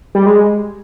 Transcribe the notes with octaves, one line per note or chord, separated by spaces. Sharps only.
G3
G#3